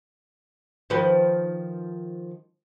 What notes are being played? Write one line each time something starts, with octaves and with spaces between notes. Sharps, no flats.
D#3 F3 B4